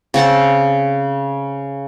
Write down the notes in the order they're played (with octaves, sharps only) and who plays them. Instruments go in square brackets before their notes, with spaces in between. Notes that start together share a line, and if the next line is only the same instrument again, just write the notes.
[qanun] C#3 C4 F#5 A5